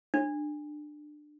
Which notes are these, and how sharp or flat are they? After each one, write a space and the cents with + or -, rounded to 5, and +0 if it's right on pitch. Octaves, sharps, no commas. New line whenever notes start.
D4 +25